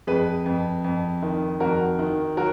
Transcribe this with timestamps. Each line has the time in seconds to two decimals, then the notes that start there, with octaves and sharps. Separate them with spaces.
0.07 F2 G#4 B4
0.46 F2
0.84 F2
1.23 D#3
1.60 F2 F#4 A#4
1.99 D#3
2.37 F#3 F#4 A#4